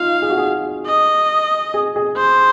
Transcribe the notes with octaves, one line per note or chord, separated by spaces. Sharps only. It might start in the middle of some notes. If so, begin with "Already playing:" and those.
Already playing: D#4 F4 F5
G#4
F#4
G#4
D#5
G#4
G#4
C5